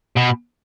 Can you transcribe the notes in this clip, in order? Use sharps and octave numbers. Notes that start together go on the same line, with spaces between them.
B2